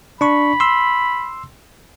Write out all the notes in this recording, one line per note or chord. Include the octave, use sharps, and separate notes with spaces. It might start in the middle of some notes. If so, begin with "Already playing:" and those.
D4 B5 C#6
C6 E6